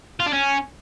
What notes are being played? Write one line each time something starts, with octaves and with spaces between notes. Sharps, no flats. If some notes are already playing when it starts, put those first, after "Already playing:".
F4
D4
C#4